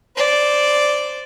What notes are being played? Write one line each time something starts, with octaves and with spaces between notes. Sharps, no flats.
C5 D5